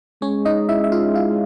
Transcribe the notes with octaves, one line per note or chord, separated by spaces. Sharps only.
G#3 C#4 C#5
D#4 D#5
E4 E5
E5
F4 F5
F4 F5